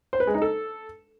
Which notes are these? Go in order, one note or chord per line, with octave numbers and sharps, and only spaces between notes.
C5
B4
G#3
D#4
A4